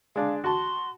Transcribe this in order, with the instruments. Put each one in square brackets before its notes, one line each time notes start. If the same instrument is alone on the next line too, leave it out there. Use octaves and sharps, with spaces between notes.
[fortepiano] G#3 D4 [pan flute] F5
[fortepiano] F#4 A5 [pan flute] C6